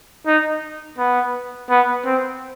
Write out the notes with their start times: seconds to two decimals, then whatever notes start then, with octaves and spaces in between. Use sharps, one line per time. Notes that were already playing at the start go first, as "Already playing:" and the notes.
0.26 D#4
0.98 B3
1.70 B3
2.05 C4